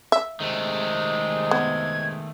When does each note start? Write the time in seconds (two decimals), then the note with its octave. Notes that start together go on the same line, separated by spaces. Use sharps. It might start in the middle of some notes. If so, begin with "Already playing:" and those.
0.12 E5
0.40 C3 D#3 G#3 A3
1.51 B3 G#6